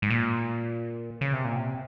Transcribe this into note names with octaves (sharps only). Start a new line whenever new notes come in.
G#2
A#2
C#3
C3
A#2
C3